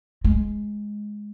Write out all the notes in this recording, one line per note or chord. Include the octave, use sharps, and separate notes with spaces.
G#3